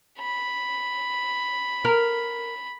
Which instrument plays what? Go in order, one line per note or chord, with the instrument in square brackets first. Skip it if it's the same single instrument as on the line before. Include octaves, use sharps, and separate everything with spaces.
[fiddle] B5
[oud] A#4